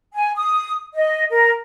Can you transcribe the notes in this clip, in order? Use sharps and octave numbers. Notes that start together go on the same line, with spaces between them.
G#5
D#6
D#5
A#4